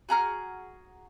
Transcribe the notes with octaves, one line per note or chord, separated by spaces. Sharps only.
F#4 G#4 A#5 F6